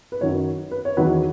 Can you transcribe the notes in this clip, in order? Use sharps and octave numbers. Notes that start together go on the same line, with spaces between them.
B4
F#2 D#3 F#3 C#5
B4
C#5
E2 D#3 F#3 B4